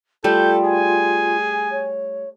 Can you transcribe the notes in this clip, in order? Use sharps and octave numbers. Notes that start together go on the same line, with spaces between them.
G3 A3 F4 A4 G6
G#4 G#5
C#5